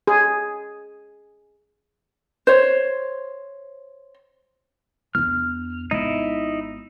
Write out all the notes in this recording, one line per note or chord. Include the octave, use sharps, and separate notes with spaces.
G#4
C5 C#5
E2 D4 F6
G#1 B3 D#4 E4